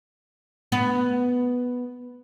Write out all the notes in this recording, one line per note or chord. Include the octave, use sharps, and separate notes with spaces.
B3